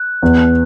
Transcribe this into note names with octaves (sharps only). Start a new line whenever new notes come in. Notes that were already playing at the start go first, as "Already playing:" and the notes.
Already playing: F#6
E2